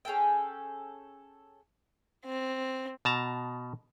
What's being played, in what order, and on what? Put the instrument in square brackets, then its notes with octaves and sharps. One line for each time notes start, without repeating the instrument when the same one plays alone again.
[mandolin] C#4 G#4 A4 G5
[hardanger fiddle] C4
[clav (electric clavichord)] B2 A5 A#5